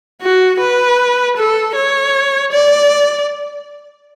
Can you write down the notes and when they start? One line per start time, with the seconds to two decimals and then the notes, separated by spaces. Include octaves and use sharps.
0.22 F#4
0.60 B4
1.37 A4
1.75 C#5
2.52 D5